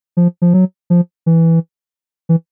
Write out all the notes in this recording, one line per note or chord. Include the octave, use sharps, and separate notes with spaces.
F3
F3
F#3
F3
E3
E3